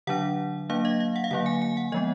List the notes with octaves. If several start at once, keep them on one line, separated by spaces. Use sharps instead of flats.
D3 F#3 D4 F#5
F#3 A#3 D4 F5
D#5
F5
F#5
F5
D3 F#3 A#3 F#5
G#5
G#5
F#5
F3 G#3 B3 D#5